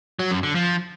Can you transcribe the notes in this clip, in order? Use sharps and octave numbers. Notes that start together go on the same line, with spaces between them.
F#3
F#2
D3
F3